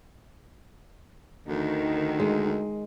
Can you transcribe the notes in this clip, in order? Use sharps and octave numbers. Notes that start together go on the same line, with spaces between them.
D2 D#3
G#3